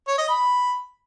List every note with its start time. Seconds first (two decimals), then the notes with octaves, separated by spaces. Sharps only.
0.08 C#5
0.18 D#5
0.29 B5